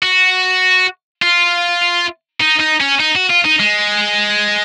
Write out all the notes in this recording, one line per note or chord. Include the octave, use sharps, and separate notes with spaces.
F#4
F4
D#4
D#4
C#4
D#4
F#4
F4
D#4
G#3